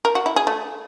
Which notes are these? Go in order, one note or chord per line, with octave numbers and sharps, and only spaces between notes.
A#4
F#4
E4
G#4
A3